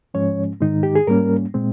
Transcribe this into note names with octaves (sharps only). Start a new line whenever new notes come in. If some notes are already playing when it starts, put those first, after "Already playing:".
G#2 F3 G#3 C#4 C#5
G#2 D#3 G#3 D#4
G4
G#4
G#2 G3 A#3 C#4 A#4
A#2 G#3 C4